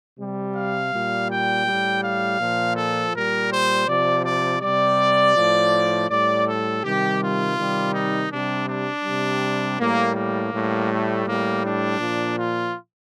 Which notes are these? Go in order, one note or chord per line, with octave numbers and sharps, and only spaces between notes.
C3 G3
F5
A#2 G3
G5
A2 G3
F5
A#2 F3
A4
A#2 G3 A#4
C5
C3 F3 D5
D5
C3 G3 D5
A2 F3
A2 G3 D5
A4
C3 D#3 G3 G4
F4
C3 D#3 G3
D#4
C3 G3 D4
D4
C3 G3
A2 G3 A#3
A#3
A2 G3
A3
A2 G3 A#3
D4
A#2 F3
F4